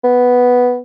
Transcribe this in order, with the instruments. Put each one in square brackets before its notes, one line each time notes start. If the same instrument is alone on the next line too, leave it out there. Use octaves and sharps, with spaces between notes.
[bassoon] B3